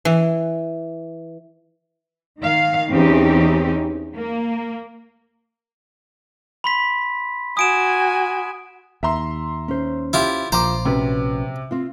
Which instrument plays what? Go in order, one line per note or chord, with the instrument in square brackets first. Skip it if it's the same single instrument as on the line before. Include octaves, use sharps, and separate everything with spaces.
[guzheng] E3
[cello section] D#3 F5
E2 E3 C4 C#4 D#4 G4
A#3
[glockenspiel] B5 C6 B6
[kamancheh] F#4 G#5 [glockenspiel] D#6 D7 E7
[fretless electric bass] D#2 [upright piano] E5 A#5 C6
[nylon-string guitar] C#4 C5
[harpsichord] E4 F4 G4
[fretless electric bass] A#1 [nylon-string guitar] F3 [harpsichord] C5 [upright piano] A#5 D6
[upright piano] C3 [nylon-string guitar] C#4 F#4 B4
[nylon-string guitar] C4 F4